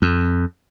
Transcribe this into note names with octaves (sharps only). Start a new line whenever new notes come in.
F2